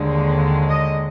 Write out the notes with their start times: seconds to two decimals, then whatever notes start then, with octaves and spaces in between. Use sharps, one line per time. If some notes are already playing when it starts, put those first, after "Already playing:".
Already playing: D#2 D3 G#3
0.69 D#5